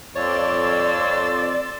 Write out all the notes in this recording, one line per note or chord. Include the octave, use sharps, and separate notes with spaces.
F2 C#5 D5 C6 E6 A6